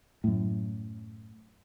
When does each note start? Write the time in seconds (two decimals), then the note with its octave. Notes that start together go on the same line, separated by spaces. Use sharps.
0.24 F#2 A2